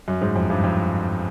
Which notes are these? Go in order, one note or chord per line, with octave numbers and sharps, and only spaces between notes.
F#2
G#2
F2
G2
F2